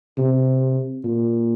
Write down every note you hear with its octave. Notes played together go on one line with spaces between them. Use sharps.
C3
A#2